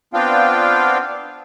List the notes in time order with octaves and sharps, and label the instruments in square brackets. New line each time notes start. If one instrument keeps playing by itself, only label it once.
[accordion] B3 C4 D4 F4 F5 G5